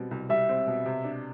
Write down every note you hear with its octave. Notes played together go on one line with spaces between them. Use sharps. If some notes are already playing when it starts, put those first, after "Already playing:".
Already playing: B2 G3 C4
C2
G3 E5
C4
B2
C3
D4